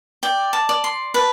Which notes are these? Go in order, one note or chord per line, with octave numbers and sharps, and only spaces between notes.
D5 G5
A5
D5
C6
B4 A5